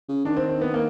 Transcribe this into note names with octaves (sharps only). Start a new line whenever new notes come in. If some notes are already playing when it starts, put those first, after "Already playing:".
C#3
D#3 D4
C4
C4
B3
A#3